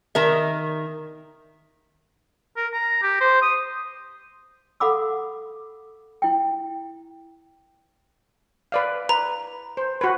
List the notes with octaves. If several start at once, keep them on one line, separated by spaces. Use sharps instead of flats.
D#3 A#4 E5
A#4
A#5
G4
C5
D#6
A4 F5 F#5 B5 D6 E6
E4 G5
B4 D5 F5
B4 A#5
C5
F#4 B4